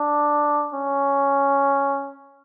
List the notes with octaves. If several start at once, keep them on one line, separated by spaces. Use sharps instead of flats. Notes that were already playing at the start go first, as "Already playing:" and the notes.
Already playing: D4
C#4